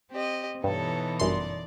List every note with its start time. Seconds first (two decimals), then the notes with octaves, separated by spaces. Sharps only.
0.11 C4 G4 D#5
0.64 G2 B2 E3 D#4 A4 C#5
1.20 G1 F#2 D5 C6